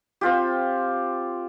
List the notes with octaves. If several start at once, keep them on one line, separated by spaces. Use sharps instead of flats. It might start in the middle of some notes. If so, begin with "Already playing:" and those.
C4 F4 G4